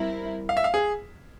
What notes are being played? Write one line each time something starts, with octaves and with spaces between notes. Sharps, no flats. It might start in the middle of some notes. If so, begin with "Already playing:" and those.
Already playing: G3 C4 E4 A#4
F5
E5
F5
G#4